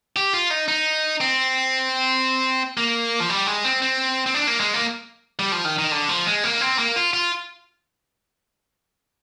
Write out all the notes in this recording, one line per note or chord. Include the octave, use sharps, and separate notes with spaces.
G4
F4
D#4
D#4
C4
A#3
F3
G3
G#3
C4
C4
C4
D4
A#3
G#3
A#3
G3
F3
D#3
D#3
D3
F3
G#3
A#3
C4
A#3
F4
F4